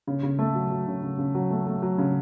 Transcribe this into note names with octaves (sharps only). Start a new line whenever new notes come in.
C#3
C#3
A3
F#3
F#3
C#3
C#3
C#3
F#3
A3
A3
F#3
C#3